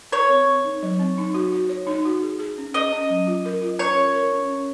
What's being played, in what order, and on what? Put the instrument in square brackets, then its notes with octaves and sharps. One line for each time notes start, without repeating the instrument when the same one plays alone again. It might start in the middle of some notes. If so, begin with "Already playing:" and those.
[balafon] A#4 [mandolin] C#5
[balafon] C4
C4
D#4
F#3
C4
D#4
F#4
F#4
C#5
D#4
F#4
G#4
G#4
C#4
[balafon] G#4 [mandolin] D#5
[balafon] C#4
F#3
F4
A#4
F4
[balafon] C#4 [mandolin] C#5
[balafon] A#4
A#4
C#4
C#4